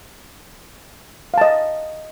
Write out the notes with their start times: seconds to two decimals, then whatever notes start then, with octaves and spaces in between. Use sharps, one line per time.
1.34 F5
1.38 A5
1.41 D#5